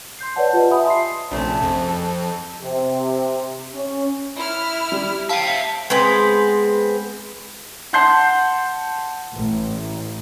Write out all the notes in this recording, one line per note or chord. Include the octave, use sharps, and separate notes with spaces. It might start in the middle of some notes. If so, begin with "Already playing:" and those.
C6 G6 C7
B4 C#5 D5 F#5 A5
F4 G4 B4 D#5
E5 G#5 A5 B5 D#6
C6 C7
A#1 C3 A3 C#4
F2
A4
C3
C#4
E4 F6
G3
E5 F5 G5 A5
G#3 B3 C4 B4
F#5 A5 C6 G6 C7
A1